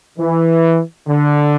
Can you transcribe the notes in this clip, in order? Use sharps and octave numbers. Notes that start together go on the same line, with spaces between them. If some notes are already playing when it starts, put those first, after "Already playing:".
E3
D3